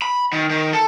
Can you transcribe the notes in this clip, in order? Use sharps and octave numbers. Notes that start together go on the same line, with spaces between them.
B5
D#3
D#3
A4